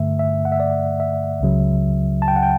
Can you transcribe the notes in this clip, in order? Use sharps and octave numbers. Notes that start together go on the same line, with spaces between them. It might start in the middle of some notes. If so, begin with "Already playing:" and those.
Already playing: G2 D3 A3 E5
E5
F#5
E5
D5
E5
C#2 C#3 F#3
A5
G5
F#5
G5